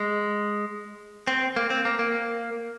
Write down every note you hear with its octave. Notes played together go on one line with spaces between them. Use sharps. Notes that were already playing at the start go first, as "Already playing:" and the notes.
Already playing: G#3
C4
A#3
C4
A#3
A#3